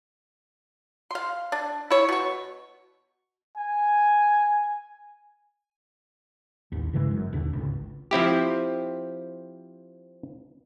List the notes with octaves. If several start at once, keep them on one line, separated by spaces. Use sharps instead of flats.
F5 C6
D4
E4 C#5
B2 C#6
G#5
A1 D#2
G2 C#3 E3 G#3
G1 F#2
D#2 B2 D3 D4
G#1 C#2
F3 C4 E4 G4